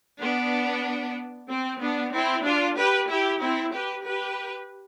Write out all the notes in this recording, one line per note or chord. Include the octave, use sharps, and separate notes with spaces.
B3 D4
C4
B3 D4
C4 E4
D4 F4
G4 B4
E4 G4
C4 E4
G4 B4
G4 B4